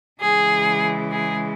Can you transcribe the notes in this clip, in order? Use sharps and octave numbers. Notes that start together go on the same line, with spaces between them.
C#3 E3 G#3 G#4
G#4